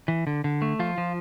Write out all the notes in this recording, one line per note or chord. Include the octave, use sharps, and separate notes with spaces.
E3
D3
D3
A3
F3 F4
F3